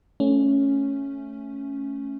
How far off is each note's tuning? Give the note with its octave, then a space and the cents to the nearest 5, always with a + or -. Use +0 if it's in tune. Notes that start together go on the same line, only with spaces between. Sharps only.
A3 +0 C#4 +0